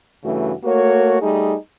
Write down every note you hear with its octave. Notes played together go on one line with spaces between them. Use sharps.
G2 C#3 E3 A3 F#4
A3 A#3 F#4 A#4 C#5
G3 A3 D#4 G#4